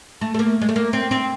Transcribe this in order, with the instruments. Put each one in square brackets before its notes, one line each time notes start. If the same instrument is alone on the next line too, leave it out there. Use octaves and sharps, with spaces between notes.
[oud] A3
A3
A#3
G#3
A3
A#3
C4
C4